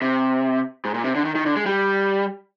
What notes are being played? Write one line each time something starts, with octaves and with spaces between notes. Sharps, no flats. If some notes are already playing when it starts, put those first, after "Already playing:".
C3
G#2
A#2
C3
D3
D#3
D#3
D3
G#3
G3